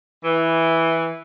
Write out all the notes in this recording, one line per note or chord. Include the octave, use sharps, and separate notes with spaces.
E3